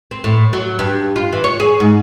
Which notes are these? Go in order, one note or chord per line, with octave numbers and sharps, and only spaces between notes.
C4
A2
F#3
G2
F4
E3
C#5
G#4
G#2